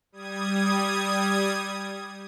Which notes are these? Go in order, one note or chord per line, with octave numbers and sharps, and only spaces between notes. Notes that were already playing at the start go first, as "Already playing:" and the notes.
G3 D#6 G#6